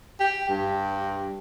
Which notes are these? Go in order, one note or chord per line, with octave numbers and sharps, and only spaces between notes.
G4
G2